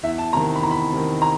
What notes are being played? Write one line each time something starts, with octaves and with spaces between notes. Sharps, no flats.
E2 E5
A5
C3 D#3 A#5
B5
E2 A#5
B5
C3 D#3
A#5